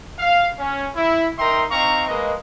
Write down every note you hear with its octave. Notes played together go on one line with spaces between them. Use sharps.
F5
C#4
E4
D#4 A#4 E5 G5 A#5 C6
C4 D#4 F5 A#5 C#6
G#3 A#3 B4 D#5